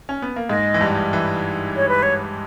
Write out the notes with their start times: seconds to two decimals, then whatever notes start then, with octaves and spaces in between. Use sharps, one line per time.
0.09 C#4
0.22 B3
0.36 A#3
0.50 G#2 G#3 D#5
0.74 E3
0.81 G2 G3
1.13 E3
1.76 C#5
1.89 B4
2.03 C#5